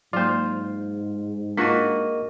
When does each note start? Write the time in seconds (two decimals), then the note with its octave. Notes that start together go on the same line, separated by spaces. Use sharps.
0.13 G#2 F#3 A#3 F4 C5
1.58 A#3 D4 F4 F#4 A#4 D#5 A5